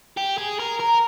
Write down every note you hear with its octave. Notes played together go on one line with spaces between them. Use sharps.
G4
G#4
A#4
A#4